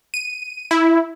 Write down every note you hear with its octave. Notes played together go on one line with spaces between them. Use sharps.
D#7
E4